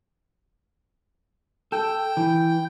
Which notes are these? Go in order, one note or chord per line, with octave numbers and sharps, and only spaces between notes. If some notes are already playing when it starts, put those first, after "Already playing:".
A4 G5
E3